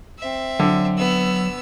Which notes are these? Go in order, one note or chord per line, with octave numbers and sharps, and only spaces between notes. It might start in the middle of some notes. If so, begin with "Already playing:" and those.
C4 E5
D3 F#3
B3 E6